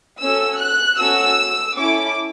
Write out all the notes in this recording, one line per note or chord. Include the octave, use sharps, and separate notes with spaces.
C#4 F#4 A4 E6
F#6
C#4 F#4 A4 E6
C#4 E4 A4 D6